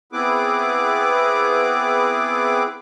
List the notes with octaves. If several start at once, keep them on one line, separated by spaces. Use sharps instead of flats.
B3 C4 E4 G#4 B4 D6